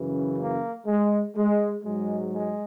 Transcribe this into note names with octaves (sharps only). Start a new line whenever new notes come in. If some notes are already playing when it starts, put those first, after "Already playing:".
Already playing: F#2 C#3 E3
A#3
G#3
G#3
G#2 F#3 G#3
G#3